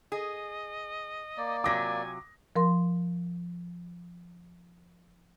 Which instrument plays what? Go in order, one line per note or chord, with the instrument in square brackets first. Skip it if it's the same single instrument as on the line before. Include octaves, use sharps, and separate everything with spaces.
[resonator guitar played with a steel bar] G#4 [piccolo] D#5
[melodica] A#3 D5
[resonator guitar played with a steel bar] C3 F#3 F4 [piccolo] G#5 [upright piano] D6 A#6
[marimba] F3 A#4 C6